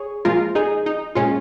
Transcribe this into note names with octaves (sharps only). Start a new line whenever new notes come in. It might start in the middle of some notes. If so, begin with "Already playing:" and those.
Already playing: G#4 C#5
A#2 F3 G#3 F4 A#4
D#4 G#4
D#4
A#2 G#3 C#4 F4